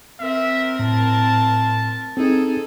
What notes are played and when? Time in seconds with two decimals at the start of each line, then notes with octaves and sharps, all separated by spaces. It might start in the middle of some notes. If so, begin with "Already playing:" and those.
0.20 C4 A#4 E5
0.79 A2 A5
2.17 C4 D#4 G#4 A4